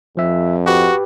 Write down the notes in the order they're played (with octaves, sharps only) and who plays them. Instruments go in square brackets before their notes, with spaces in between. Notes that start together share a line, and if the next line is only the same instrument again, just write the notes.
[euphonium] F2 [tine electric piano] F3 E5
[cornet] F#4 [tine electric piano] G4 B4